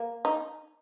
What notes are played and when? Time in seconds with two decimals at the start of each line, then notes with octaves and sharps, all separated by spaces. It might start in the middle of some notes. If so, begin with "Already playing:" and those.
Already playing: A#3
0.25 D#4